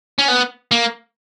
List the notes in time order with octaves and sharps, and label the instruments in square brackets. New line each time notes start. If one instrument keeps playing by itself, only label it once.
[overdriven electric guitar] C#4
B3
A#3